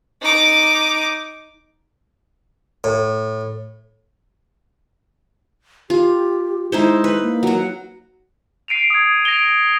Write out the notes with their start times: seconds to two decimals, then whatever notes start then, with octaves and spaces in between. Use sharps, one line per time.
0.22 D#4 D6
2.84 A2
5.90 F4 G4
6.72 G#3 D#4 E4 C5
7.04 B4
7.21 A#3
7.43 F#3 F#4
8.68 C7 D7 D#7 F7
8.90 D#6 G#6
9.25 A#6 D7 F7 G7